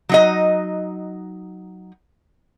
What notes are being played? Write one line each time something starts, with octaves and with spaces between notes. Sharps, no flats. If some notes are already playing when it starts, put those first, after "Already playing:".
F#3 D#4 D#5